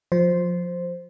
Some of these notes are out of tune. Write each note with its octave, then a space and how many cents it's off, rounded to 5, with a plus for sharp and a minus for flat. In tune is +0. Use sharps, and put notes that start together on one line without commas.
F3 +25 C5 +0